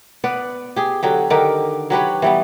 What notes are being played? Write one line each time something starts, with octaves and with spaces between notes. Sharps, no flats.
B3 B4 D5
G4 G#4
D3 F#3 G4
D3 D#3 G4 A#4
F#3 G4 B4 C#5
E3 G3 B3